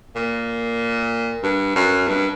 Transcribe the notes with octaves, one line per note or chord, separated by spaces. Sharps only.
A#2
G2
F#2
G2